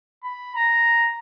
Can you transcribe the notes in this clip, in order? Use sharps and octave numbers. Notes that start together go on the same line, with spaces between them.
B5
A#5